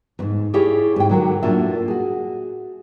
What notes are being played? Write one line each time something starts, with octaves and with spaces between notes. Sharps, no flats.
F2 G#2
E4 G4 G#4 C#5 D5 F5
G#2 G5
D3 F#3 A#4
A2 A#3 D4 F4 F#4 E5
F#4 G#4